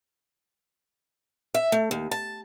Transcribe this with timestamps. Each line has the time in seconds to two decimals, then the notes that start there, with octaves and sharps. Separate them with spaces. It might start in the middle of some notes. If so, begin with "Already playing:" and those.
1.54 E5
1.72 A3
1.91 D#2
2.11 A5